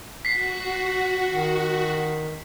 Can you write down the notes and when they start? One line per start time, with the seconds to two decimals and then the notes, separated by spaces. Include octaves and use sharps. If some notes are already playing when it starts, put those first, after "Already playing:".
0.25 F#4 B6 C7
1.30 D#3